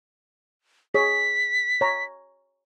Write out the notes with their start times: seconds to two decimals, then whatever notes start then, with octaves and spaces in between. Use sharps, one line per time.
0.94 G#4 C#5 B6
1.81 C#5 A#5